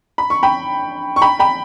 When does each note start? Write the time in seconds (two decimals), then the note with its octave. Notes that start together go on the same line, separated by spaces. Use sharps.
0.18 B5
0.30 C#6
0.43 G5 B5
1.16 C#6
1.22 G5 B5
1.39 G5 B5